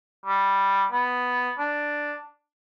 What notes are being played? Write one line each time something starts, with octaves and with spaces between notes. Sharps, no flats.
G3
B3
D4